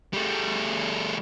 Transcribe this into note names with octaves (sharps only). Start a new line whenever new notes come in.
G3 A3